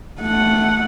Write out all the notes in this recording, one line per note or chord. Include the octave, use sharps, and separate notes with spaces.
A3 F#5